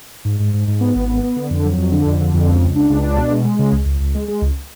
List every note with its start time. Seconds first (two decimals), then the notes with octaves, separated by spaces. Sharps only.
0.25 G#2
0.40 G#2
0.54 G#2
0.68 G#2
0.81 B3
0.95 G#1
1.09 B3
1.23 B3
1.36 D3
1.50 F2
1.64 F#3
1.78 F2
1.92 D3
2.06 F2
2.20 D3
2.34 F2
2.48 C#2
2.61 C#2
2.76 D4
2.90 C#2
3.03 D4
3.17 B2
3.31 G#3
3.44 G#3
3.59 C#3
3.72 C#2
3.86 C#2
4.00 C#2
4.15 G#3
4.28 G#3
4.42 C#2